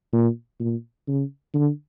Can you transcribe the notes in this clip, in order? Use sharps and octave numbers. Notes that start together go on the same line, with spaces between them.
A#2
A#2
C#3
D3